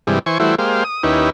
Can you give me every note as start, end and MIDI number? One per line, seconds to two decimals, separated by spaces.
0.07 0.19 43
0.07 0.19 48
0.07 0.19 52
0.07 0.19 55
0.07 0.19 56
0.26 0.38 52
0.26 0.38 72
0.26 0.38 80
0.26 0.38 85
0.40 0.55 52
0.40 0.55 55
0.40 0.55 57
0.40 0.55 64
0.40 0.55 66
0.40 0.55 72
0.58 0.84 56
0.58 0.84 58
0.58 0.84 67
0.58 0.84 72
0.58 0.84 77
0.84 1.03 87
1.03 1.30 39
1.03 1.30 61
1.03 1.30 63
1.03 1.30 64
1.03 1.30 67
1.03 1.30 71